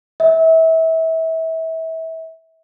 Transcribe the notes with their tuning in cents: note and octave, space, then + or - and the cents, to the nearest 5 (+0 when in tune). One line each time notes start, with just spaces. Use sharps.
E5 -30